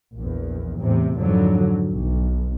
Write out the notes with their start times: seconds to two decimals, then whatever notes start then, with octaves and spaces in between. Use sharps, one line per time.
0.15 A#1 E2
0.79 E2 A2 C3
1.18 F2 G#2 D3 F#3
1.92 B1